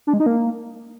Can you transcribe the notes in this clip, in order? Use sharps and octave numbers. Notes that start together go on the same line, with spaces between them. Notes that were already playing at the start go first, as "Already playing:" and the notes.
D4
G#3
D#4
A#3